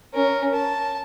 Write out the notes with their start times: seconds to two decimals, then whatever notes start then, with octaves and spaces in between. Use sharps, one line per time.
0.13 C#4 A#4
0.54 A5